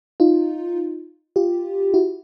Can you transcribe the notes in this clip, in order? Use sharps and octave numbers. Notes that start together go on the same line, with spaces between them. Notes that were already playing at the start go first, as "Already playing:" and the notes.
D#4 F4
F4 G4
E4 F#4